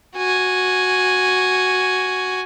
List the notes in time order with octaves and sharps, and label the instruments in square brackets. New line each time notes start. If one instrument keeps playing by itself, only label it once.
[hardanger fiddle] F#4 G#5